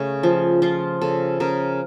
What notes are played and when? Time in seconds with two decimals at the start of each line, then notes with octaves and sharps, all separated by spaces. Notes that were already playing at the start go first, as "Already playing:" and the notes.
Already playing: C#3 A3 C#4
0.23 F3
0.62 F3 F4
1.01 C#3 A4
1.40 C#3 A#4